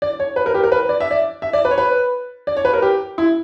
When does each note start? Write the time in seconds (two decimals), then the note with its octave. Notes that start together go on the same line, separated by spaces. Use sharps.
0.02 D5
0.20 C#5
0.36 B4
0.46 A#4
0.54 G4
0.63 A#4
0.72 B4
0.89 D5
1.00 E5
1.11 D5
1.42 E5
1.53 D5
1.65 B4
1.71 C#5
1.78 B4
2.47 D5
2.57 C#5
2.65 B4
2.73 A#4
2.82 G4
3.18 E4